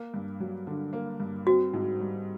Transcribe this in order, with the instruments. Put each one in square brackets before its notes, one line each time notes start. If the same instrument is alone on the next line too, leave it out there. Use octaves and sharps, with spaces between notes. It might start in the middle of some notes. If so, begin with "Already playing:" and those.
Already playing: [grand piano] A#3
G2
F#3
D3
A#3
G2
[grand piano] C4 [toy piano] F#4
[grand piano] G#2
G3